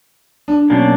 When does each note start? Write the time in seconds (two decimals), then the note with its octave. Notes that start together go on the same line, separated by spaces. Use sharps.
0.48 D4
0.70 B2 F#3 A#3 C#4 D4